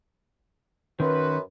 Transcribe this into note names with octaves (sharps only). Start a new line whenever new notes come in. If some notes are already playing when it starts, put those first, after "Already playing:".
F#2 D#3 C#4 F#4 B4 C6